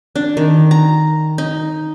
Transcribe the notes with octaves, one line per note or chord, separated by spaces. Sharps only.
D4
D#3
A#5
D#4